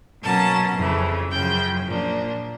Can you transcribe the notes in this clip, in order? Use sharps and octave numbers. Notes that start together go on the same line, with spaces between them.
B2 F#3 A#3 C#4 A5
F2 C#3 E3 A3
F#2 C#3 F3 G5
A#2 F3 A#3 D4